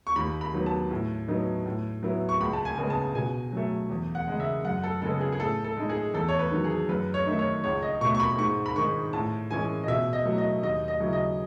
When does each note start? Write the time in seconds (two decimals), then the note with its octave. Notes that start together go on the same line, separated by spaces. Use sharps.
0.07 C#6
0.16 D#2 B5
0.41 B5
0.53 D#3 F#3 B3
0.66 A5
0.91 A2
1.28 F#3 B3 D#4
1.66 A2
2.03 F#3 B3 E4
2.29 C#6
2.40 C#2 B5
2.53 A5
2.65 G#5
2.77 C#3 G#3 B3
2.90 A5
3.15 B2 G#5
3.53 F#3 A3
3.90 E2
4.15 F#5
4.28 C#3 G#3
4.40 E5
4.65 F#2 F#5
4.84 A4
5.02 C#3 G#3 B3 A4
5.21 G#4
5.32 G#4
5.40 A2 A4
5.64 A4
5.77 G#3 D#4
5.89 G#4
6.14 E2 A4
6.29 C#5
6.39 B4
6.52 D#3 F#3
6.64 G#4
6.89 F#2 B4
7.14 C#5
7.26 D#3 A3 D#4
7.39 C#5
7.64 C#2 C#5
7.82 D#5
8.01 B2 A3 C#6
8.15 C#6
8.20 B5
8.38 G#2 C#6
8.66 B5
8.76 D#3 G#3 C#6
9.13 A2 A5
9.51 E3 G#3 C#4 G#5
9.84 D#5
9.88 B2 E5
10.13 D#5
10.25 F#3 A3 E4
10.38 D#5
10.63 D#2 D#5
10.88 D#5
11.00 C#3 F#3 C#4 E4
11.13 D#5